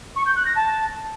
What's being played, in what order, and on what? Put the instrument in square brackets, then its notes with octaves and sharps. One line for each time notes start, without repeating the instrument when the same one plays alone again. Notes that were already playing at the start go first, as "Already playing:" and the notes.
[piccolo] C#6
G6
F#6
A#6
A5